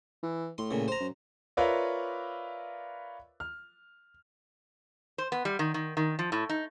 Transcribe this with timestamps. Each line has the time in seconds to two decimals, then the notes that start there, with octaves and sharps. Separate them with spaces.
0.23 E3
0.58 A2 C6
0.71 A#2 C#3
0.88 C5 A#5
1.00 F#2
1.57 F4 A#4 B4 C#5 D5 E5
3.40 F6
5.18 C5
5.32 B3
5.45 G3
5.59 D#3
5.74 D#3
5.97 D#3
6.19 F3
6.32 A2
6.49 D#4